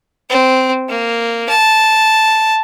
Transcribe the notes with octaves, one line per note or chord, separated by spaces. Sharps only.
C4
A#3
A5